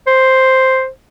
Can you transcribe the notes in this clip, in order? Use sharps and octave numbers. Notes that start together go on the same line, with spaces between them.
C5